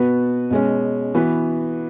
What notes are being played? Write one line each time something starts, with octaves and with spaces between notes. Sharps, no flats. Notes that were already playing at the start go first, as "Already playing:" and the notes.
Already playing: B2 B3 F#4 B4
B2 G#3 C#4
E3 B3 F#4 B4